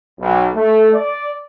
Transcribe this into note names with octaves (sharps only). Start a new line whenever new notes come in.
B1
A3
D5